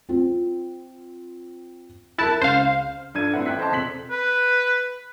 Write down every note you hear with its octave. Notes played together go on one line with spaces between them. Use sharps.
C4 F4
E4 A#4 A5 F#6
C#2 C5 F5
G2 D4 A4 G#6 D#7
A2 C4 B4 E5 F#5
A1 G5 F#6 B6
C5 D#5 A5 C6
E1 C3 A4 B6 F#7
B4